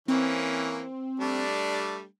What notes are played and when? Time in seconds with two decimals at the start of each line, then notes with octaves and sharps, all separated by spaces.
0.08 E3 A#3 C4 C#4
1.20 G3 A3 D4